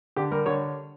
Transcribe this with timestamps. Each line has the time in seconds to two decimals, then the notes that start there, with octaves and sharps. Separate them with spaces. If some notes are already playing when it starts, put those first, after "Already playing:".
0.16 D3 G4
0.31 G3 A#4
0.46 D3 C#5